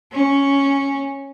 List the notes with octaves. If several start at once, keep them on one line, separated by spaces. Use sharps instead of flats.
C#4